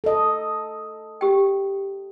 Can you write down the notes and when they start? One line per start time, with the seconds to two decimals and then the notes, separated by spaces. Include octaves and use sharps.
0.04 A4 D#5
1.21 G4 G5